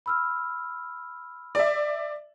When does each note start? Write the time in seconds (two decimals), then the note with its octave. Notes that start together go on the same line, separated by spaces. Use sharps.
0.06 B5 E6 F6
1.55 D5 E5